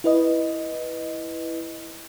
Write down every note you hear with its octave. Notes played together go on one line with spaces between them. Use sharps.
E4 B4 D#5